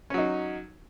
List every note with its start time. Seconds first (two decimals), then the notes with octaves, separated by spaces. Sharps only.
0.10 C#4
0.14 F#3
0.18 D#4